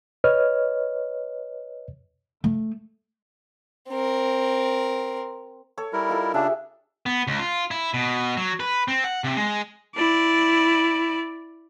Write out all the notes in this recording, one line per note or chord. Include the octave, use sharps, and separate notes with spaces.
B4 C#5 D#5 F6
A3
C4 A#4
A4 C#5
G3 E4 A#4
D#4 F4 A4
C#3 D4 G4 G#4 E5
B3
C#2
F4
E4
B2
F#3
B4
C4
F#5
C3
G#3
E4 D5